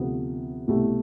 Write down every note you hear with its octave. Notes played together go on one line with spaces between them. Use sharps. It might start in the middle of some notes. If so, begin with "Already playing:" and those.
Already playing: D2 C3 F3 B3
C2 B2 A3 E4 G4